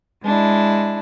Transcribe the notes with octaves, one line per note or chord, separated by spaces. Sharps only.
G#3 D4 E4